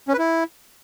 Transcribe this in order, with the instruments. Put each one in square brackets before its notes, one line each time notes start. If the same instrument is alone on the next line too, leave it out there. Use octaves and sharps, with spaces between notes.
[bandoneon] C#4
B4
E4